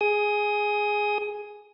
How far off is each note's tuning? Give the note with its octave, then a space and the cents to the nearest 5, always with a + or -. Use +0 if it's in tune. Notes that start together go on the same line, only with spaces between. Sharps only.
G#4 +0 D#6 +20